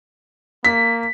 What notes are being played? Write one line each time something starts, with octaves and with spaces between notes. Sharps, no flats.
A#3 B6